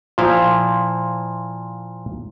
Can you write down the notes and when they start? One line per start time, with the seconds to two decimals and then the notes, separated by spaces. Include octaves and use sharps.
0.18 A#2 F3 E4 C5 F5